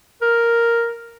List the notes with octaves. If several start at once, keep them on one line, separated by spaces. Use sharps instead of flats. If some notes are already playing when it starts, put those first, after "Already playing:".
A#4